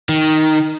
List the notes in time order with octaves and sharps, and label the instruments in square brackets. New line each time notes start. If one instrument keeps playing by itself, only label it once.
[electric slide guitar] D#3